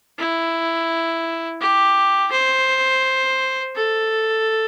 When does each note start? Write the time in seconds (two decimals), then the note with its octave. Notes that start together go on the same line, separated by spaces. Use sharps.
0.18 E4
1.61 G4
2.32 C5
3.75 A4